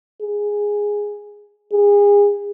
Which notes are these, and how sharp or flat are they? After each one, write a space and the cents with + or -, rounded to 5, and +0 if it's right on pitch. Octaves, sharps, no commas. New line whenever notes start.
G#4 -5
G#4 -30